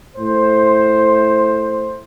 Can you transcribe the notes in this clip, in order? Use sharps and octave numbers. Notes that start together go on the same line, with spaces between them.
A2 C5